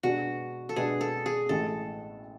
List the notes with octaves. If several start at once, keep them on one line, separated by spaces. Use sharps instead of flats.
B2 G#3 B3 D4 F#4
A4
B2 G#3 B3 D4 G#4
A4
G#4
A1 A2 G#3 A4